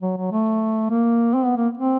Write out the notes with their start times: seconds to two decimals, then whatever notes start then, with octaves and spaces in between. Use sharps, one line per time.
0.02 F#3
0.17 F#3
0.32 A3
0.90 A#3
1.34 C4
1.45 B3
1.56 A#3
1.77 C4